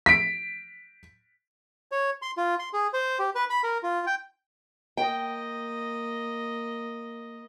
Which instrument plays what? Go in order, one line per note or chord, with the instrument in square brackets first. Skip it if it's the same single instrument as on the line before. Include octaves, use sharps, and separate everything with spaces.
[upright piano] B6 D7
[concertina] C#5
C6
F4
C6
G#4
C5
G4
B4
B5
A#4
F4
G5
[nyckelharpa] A#3 D#5 [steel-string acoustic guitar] G5